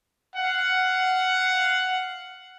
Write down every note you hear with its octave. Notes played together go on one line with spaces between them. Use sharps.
F5 F#5